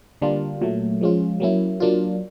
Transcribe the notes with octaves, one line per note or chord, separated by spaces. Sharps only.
D3 G3 A#3 D4 F4
A#2 F#3 A3
F3 G#3 C#4 F4
F#3 A#3 C#4 E4
F#3 A#3 D4 F4